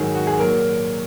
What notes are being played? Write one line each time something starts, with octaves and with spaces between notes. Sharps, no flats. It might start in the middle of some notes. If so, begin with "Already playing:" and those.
Already playing: G#2 D#3 F#3 G#4
F#4
G#4
A#2 F#3 A#4